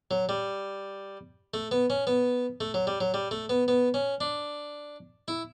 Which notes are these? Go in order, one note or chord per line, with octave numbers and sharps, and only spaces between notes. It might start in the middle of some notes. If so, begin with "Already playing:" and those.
F#3
G3
A3
B3
C#4
B3
A3
F#3
G3
F#3
G3
A3
B3
B3
C#4
D4
E4